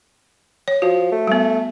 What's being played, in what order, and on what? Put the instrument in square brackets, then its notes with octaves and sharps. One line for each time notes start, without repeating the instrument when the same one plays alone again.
[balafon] C#5
[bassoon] F3 [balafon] F#4
[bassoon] A3
[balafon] G3 B3